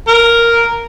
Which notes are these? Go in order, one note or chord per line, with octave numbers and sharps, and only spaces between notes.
A#4